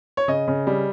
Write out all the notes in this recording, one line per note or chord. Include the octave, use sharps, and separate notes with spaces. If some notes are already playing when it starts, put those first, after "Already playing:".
C#5
C#3 D#5
C#3
G3